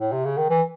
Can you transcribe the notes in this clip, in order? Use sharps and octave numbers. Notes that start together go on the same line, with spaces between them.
A2
C3
C#3
D#3
E3